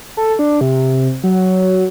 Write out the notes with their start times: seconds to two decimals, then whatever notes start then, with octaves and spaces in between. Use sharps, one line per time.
0.17 A4
0.39 D4
0.61 C3
1.23 F#3